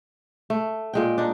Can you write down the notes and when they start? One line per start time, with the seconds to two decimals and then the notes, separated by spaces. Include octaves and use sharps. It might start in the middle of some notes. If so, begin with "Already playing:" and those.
0.50 A3
0.93 A#2 G#3 G5
1.18 D4 D#4